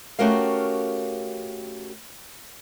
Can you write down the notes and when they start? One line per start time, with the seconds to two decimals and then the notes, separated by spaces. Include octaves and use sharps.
0.19 A3 C#4 F#4 G4 A#4 F5